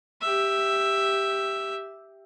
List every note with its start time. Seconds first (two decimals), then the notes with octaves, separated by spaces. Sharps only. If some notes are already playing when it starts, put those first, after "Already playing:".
0.21 G4 E5